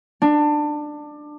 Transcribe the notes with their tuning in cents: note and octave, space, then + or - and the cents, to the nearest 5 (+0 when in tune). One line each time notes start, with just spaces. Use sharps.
D4 +20